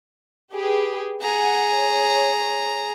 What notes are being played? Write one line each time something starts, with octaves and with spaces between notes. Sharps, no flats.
G4 G#4 B4
G#4 F#5 G#5 A#5
C#5